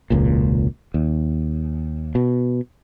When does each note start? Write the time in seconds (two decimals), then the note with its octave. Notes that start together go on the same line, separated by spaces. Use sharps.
0.10 E1 C#2 A#2
0.94 D#2
2.15 B2